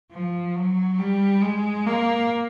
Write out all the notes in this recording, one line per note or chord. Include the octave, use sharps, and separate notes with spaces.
F3
F#3
G3
G#3
A#3